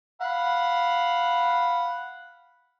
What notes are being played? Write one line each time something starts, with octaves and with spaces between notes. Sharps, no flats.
F5 F#5 B5